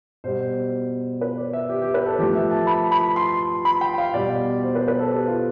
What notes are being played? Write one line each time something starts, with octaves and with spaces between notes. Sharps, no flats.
B2 G3 C5
B4
D5
E5
G4
G4
B4
A4
A2 F3 G4
E5
A5
B5
B5
C6
B5
G5
F5
B2 G3 D5
C5
B4
B4
A4
G4
F4